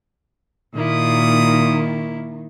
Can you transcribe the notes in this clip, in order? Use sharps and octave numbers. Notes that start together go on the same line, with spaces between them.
A#2 D#3 A#3 E4 D#6